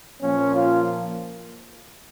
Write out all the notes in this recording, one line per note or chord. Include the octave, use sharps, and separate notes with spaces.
A#2 F3 A#3 C#4
F4